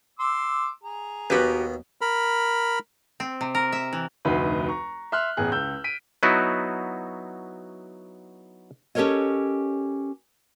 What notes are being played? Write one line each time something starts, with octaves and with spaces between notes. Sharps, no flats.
C6 D6 E6
G#4 A#5
D#2 B2 F#4 G4 B4
A#4 B5
C4
C3
A#4
E5
E3
F1 D2 D#4 F#4 B4 C6
A#5 C#6
E5 C6 F6 F#6
A1 E2 G#4 F#6
C#2 E6 G6
B6 D7 D#7
F#3 B3 D#4 E4 F#4
C#4 G4 A4 A#4 C#5 D#5